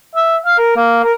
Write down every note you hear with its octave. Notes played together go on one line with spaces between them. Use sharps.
E5
F5
A#4
A#3
A#4